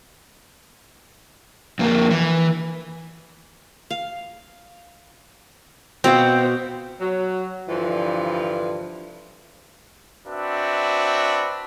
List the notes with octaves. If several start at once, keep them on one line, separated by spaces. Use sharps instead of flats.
F2 A#3
E3
F5
B2 C4 C#5 F5
F#3
G2 D3 E3 F3
C4 D4 F#4 B4 E5